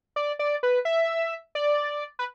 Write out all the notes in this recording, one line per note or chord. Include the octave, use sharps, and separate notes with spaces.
D5
D5
B4
E5
D5
B4